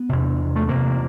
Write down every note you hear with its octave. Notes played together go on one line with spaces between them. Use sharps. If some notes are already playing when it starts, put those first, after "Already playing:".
Already playing: B3
E2 C3
A3
E2 C3 A#3